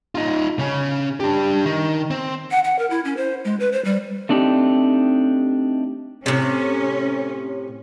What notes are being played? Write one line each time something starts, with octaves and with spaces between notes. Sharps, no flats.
D#4 F4
C#3 C#4
D4 G4
D#3
C4
F#5
F#5
A#4
E4
C#4
C5
G#3
B4
C5
G3
A3 C4 D4 D#4 F#4 G4
A2 C3 C#4